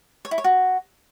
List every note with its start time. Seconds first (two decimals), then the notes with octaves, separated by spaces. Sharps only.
0.25 C#5
0.31 E4
0.38 C#5
0.44 F#4